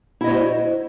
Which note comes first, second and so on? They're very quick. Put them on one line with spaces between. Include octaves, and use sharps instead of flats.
E4 D#5 C#5 F#4 C5